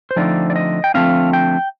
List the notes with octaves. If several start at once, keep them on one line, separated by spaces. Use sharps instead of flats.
C5
D3 F3 A3 C4 D#4 D5
D5
D#5
G5
D3 F3 A3 C4 D#4 F5
G5